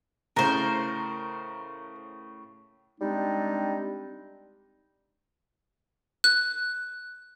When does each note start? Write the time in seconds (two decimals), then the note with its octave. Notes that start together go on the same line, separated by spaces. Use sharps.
0.36 A2 C#3 A#4 C5
3.00 G3 G#3 C4 D4 D#4
6.24 F#6